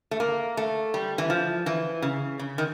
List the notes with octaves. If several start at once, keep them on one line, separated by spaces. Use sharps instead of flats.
A3
A#3
A3
G3
E3
F3
E3
C#3
C#3
D#3